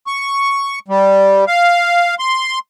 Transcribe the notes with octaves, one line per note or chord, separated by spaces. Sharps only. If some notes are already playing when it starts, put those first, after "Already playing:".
C#6
G3
F5
C6